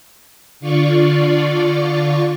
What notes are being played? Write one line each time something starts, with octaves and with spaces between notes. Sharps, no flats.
D3 F4 D5 C#6